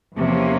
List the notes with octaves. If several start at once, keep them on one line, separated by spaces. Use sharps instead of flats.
E2 C3 F3 A#3 C#4